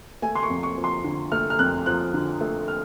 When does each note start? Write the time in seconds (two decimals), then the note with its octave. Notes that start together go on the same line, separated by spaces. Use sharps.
0.22 A3 G#5
0.35 C6
0.43 C#6
0.50 F2
0.63 C#6
0.77 F3
0.84 C6
1.04 D3
1.32 A3 F6
1.50 F6
1.59 F2 F#6
1.86 F3 F#6
2.14 D3
2.41 A3
2.68 F6